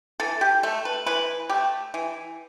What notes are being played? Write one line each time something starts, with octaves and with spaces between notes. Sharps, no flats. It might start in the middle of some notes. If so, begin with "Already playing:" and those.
E3 A4
G4
A3 A4
B4
E3 B4
A3 G4
E3